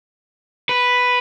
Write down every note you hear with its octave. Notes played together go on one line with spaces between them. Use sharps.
B4